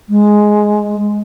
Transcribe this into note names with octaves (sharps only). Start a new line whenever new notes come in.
G#3